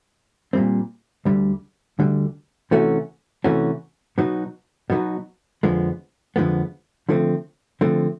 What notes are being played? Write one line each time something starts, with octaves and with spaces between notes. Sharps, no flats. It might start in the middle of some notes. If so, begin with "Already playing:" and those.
A#2 G3 C4
D2 D3 G3
D2 D3 G3
C3 E3 A3 C#4 F#4
C3 E3 A3 C#4 F#4
B2 F#3 B3 D#4 F#4
B2 F#3 B3 D#4 F#4
F2 D3 F3 G#3 B3
F2 D3 F3 G#3 B3
D3 F3 A3 C4
D3 F3 A3 C4